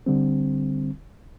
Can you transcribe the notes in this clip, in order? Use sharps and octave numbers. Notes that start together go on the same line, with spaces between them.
D2 D3 G3 C4